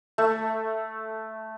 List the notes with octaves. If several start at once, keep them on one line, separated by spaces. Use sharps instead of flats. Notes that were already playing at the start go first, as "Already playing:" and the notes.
A3